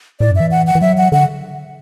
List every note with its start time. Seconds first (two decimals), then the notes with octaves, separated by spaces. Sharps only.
0.20 A2 D5
0.31 F#2
0.36 E3 E5
0.51 F#5
0.67 F#5
0.75 E3
0.81 F#3 E5
0.97 F#5
1.12 D3 F#5